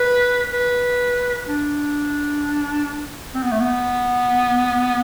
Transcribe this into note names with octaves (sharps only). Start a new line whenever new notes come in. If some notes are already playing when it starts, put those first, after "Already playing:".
Already playing: B4
B4
D4
C4
B3
A3
B3